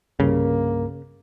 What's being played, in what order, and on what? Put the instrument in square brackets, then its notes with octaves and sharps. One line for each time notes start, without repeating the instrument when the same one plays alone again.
[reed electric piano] C2 G2 [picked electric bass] C#3 [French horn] A#3